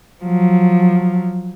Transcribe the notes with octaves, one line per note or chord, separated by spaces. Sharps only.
F3 F#3